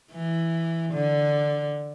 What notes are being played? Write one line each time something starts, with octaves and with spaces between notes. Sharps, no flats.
E3
D3